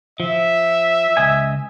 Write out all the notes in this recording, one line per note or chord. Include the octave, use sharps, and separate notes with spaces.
F3 E5
C#2 D#5 G#5